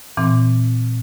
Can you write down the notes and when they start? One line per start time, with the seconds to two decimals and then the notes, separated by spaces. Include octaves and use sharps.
0.17 A#2 E3 C4